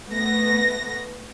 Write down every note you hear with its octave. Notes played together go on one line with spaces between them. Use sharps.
A3 B3 A#6